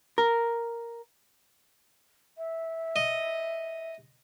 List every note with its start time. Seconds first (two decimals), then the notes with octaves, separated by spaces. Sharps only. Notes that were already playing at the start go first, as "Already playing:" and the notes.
0.18 A#4
2.38 E5
2.96 D#5